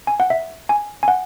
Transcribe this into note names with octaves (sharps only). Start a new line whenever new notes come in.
G#5
F#5
E5
G#5
G#5
F#5